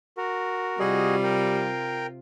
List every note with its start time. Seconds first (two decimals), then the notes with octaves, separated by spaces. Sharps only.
0.17 F#4 A#4
0.80 C3 G3 F4 F#4 G#4 D#5
1.23 A#4 G5